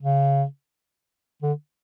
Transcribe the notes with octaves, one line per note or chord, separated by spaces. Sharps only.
C#3
D3